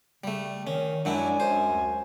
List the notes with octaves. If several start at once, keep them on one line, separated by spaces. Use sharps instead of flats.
C#3 G3 A3
D#3 C#4
F#2 F#3 G#3 D4 E4 G#5
F#2 C5
D2